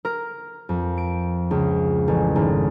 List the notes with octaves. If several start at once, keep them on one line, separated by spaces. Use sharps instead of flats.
A#4
F2
D7
C#2
A1
G#1